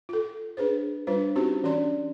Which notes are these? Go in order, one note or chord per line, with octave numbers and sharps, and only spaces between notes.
F4 A4
D4 G#4 B4 C5
G3 D4 F4 B4 C5
C4 C#4 D#4 F#4 G4 C5
E3 C#4 D4 D5 C6